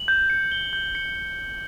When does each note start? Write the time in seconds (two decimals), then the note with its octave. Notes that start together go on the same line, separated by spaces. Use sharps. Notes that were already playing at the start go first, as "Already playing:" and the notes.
Already playing: F#7
0.08 G6
0.30 C#7
0.52 G7
0.73 G6
0.95 C#7